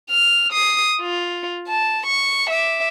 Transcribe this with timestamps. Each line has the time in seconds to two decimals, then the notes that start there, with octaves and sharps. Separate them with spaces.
0.10 F6
0.53 D#6 C7
1.02 F4
1.68 A5
2.06 C#6
2.50 E5 D6